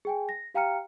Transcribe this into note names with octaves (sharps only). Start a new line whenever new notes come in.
G#4 G5 G#5
A#6
G4 F5 G5 A#5 F6 C#7